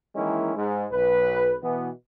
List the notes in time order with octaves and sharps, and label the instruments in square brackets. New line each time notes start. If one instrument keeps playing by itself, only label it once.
[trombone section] D#3 E3 G#3 A#3 C#4 E4
G#2
B1 B4
B2 E3 B3